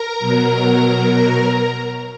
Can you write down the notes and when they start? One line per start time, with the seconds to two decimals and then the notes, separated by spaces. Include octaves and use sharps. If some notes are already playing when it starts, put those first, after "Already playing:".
Already playing: A#4 A#5
0.19 B2 F#3